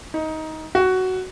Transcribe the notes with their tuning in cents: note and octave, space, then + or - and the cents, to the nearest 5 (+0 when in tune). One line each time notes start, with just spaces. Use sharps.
D#4 +15
F#4 +10